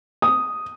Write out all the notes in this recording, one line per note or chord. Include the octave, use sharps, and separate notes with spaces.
D#6